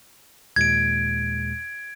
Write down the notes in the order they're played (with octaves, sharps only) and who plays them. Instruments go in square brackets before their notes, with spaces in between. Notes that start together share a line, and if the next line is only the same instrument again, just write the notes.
[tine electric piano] D#2 A#2 G#3 [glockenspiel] G#6 D7